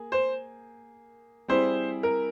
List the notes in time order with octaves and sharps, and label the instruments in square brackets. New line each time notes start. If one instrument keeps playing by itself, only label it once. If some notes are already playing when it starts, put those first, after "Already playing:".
Already playing: [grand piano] A#3 G#4
[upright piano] C5
[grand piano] G3 C4 E4 G#4 [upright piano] C5
[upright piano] A#4